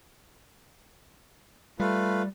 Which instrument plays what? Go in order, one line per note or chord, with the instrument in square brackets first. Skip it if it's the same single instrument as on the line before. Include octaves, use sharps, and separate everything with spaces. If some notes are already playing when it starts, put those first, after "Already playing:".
[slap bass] G3 [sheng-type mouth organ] A3 F4 B4